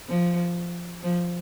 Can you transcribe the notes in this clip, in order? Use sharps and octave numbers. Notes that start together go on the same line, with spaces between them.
F3
F3